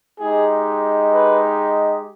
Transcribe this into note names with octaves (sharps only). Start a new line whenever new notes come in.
G#3 D#4 G4 G#4
B4